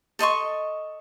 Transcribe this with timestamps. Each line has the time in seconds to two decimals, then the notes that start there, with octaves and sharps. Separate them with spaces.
0.19 A4 D#5 C6 C#6